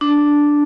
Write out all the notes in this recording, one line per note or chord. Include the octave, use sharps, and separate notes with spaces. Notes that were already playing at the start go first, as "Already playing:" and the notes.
D4